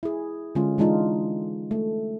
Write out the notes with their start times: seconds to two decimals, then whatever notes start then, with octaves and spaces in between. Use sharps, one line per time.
0.03 E4 G#4
0.55 D3 G#3 C#4 F4
0.78 E3 G#3 D4 D#4 F4
1.71 A3